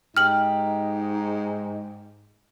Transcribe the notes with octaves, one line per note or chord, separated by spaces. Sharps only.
G#2 D#4 G4 F6 F#7